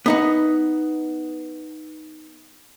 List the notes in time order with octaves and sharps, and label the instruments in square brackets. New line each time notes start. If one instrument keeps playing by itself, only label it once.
[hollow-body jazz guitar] B3 D#4 F#5